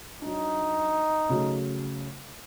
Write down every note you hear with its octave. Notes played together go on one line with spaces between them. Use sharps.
F#3 D4 D#4
C#3 F#3 A3